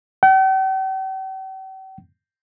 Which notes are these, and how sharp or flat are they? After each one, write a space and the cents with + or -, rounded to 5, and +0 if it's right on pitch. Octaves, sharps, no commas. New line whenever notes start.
G5 -45